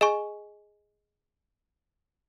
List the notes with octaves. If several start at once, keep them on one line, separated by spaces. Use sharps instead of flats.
G#4 D#5 G#5 C#6